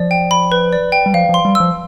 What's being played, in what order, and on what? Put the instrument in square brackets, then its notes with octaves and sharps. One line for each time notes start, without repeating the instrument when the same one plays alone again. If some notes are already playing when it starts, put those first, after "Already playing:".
Already playing: [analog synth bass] F3 [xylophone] D5
[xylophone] G5
B5
B4
D5
G5
[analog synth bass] G3
[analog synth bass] F3 [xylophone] F5
[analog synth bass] F3 [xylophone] C6
[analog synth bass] G3
[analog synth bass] F3 [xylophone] E6